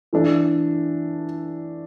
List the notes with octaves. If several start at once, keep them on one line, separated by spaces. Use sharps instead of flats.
E3 A3 D4